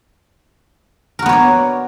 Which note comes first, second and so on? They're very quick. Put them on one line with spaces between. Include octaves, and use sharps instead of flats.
A#4 F#4 B3 C#5 D5